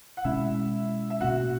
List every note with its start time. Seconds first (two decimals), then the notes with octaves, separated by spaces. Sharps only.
0.17 F#5
0.24 B2 G#3 C#4 E4 E5
1.10 E5
1.21 B2 A#3 C#4 F#4 F#5